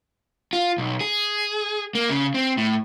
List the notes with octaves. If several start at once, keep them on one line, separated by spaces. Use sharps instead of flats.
F4
B1
G#4
A#3
C#3
C4
A2